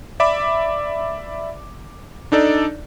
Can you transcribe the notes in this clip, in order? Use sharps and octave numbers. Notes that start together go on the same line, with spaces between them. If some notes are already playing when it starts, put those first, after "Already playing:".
D5 E5 B5 D6
D4 D#4 A4 D5